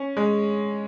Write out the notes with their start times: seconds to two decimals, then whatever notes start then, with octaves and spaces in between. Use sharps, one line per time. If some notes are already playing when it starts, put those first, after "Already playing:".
Already playing: C#4
0.17 G#3